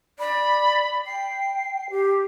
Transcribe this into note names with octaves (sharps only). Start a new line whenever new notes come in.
D5 B5
G5 C7
G4